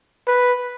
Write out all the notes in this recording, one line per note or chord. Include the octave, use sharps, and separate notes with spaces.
B4